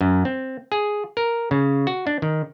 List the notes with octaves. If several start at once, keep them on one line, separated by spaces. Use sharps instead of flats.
F#2
C4
G#4
A#4
C#3
F#4
D4
D#3